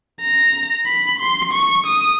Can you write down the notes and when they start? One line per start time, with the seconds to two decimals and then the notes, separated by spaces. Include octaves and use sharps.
0.21 A#5
0.87 B5
1.20 C6
1.53 C#6
1.86 D#6